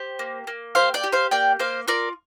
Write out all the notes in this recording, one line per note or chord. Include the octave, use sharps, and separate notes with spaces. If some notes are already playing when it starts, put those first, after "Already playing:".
Already playing: G4 C5
A#3
A#3
G4 C5 F5
D5 G5
G4
C5 F5
A#3 D5 G5
A#3 C5 F5
F4 A#4 D5